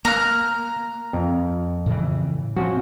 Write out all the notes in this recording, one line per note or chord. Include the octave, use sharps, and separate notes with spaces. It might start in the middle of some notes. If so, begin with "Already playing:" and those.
A#3 F5 A#5 F6 F#6
F2
A2 C#3 E3
F3 C4 C#4 F#4